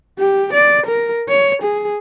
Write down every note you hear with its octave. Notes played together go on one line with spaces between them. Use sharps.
G4
D5
A#4
C#5
G#4